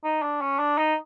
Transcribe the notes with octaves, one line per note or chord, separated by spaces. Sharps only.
D#4
D4
C#4
D4
D#4